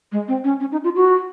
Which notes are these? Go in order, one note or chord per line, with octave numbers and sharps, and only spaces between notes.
G#3
C4
C#4
C#4
D#4
F4
F#4